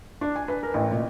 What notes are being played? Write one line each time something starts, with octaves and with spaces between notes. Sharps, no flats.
D4
G#5
B4
A#4
A1
A#2